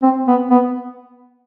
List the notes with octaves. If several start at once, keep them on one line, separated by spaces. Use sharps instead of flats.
C4
B3
B3